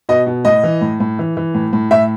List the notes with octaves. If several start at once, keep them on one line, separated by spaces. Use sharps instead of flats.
B2 D#5
B2
A2 D#5
E3
A2
A2
E3
E3
A2
A2
A2 E5